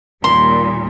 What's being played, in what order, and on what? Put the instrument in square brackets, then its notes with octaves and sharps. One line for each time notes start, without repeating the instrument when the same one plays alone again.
[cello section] D#2 A#2 G3 [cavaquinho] C6